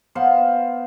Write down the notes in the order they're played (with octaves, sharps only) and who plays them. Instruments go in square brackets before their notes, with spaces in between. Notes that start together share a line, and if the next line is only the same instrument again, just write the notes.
[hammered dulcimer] B3 C5 F5 F#5